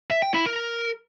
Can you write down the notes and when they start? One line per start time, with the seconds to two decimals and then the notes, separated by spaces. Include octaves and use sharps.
0.11 E5
0.23 G5
0.34 E4
0.46 A#4